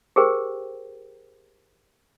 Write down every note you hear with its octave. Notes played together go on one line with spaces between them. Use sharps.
G4 G#4 A#4 C5 G5